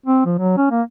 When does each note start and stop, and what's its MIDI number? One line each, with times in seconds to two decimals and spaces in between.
0.06 0.21 60
0.26 0.34 53
0.39 0.56 54
0.57 0.68 61
0.71 0.82 58